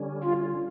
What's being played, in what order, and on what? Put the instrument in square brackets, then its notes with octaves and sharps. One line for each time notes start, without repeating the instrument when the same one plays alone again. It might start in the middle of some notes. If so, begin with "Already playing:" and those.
Already playing: [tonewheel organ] D3 G3 C#4
[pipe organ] F4